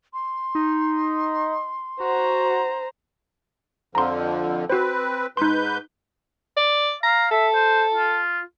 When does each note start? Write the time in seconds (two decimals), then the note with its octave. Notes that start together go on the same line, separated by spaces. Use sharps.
0.13 C6
0.55 D#4
2.00 F#4 C5 A#5
3.95 F2 D3 F3 A#5 C6
4.70 C4 F#4 B4 C5
5.37 G#2 D#4 B4 C6 G6
6.57 D5
7.03 F5 A#5
7.31 A4 E5
7.54 C5
7.95 F4